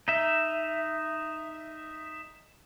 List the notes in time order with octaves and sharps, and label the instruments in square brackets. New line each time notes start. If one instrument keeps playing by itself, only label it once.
[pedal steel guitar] D#4 E5